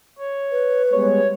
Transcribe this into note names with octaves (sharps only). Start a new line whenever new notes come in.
C#5
B4
G3 G#3 B3 C#5